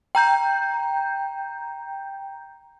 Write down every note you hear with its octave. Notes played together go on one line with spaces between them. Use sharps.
G5 A#5 G6